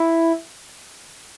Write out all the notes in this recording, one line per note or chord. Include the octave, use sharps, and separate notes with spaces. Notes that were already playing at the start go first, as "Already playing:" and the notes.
Already playing: E4